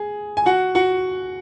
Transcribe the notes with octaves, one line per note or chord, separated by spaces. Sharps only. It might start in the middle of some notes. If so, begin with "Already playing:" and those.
Already playing: G#4
G#5
F#4 F#5
F#4 F#5